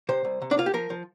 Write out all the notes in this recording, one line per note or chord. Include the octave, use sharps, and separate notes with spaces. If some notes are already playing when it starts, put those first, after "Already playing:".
C3 C5
C2
C3
D4
A#3 F4
G4
F3 A#4
F3